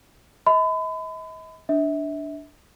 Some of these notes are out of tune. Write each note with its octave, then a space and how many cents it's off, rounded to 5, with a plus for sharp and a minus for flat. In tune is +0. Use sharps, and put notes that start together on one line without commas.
D#5 +45 B5 +35
D4 -5 E5 -30